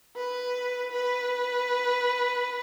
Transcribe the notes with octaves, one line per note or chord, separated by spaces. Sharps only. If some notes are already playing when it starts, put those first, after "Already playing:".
B4
B4